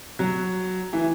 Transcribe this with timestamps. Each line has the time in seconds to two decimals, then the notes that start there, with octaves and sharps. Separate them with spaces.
0.19 F#3
0.93 E3